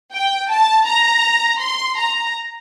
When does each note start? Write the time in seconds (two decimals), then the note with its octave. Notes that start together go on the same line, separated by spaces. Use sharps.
0.13 G5
0.50 A5
0.87 A#5
1.60 C6
1.97 A#5